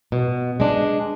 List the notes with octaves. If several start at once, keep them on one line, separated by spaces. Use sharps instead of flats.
B2
G#3 D4